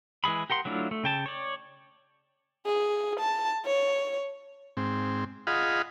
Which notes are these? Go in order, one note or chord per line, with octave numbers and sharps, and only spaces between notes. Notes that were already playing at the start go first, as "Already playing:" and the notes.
E3 G#3 G#4 B5
G4 A#4 F#5 C6
F#3 A3 D4 E4 F4
A3
C#3 G5 A5
C#5 D5
G#4
A5
C#5
G#2 C4
F4 G#4 D#5 F5 F#5 B5